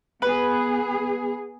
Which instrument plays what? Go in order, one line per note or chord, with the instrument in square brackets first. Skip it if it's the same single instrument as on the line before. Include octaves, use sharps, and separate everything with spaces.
[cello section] B3 G#4 [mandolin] B4